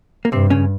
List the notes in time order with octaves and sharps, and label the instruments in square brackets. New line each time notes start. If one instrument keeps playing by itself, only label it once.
[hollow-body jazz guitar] A#3
[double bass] G2 [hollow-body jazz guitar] C3 C4
[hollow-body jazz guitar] C#3 C#4